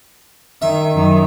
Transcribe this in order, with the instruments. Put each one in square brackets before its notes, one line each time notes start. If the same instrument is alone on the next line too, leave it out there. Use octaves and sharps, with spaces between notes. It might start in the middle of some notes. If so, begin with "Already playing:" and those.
[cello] D#3 [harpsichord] E5
[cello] F#2 D#3